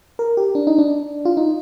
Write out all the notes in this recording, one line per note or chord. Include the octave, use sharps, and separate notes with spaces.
A#4
G4
D4
D#4
D4
F4
D#4